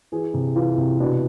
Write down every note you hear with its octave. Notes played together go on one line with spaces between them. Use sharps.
E3 G#4
C3
E3 F4
C3
B2 D4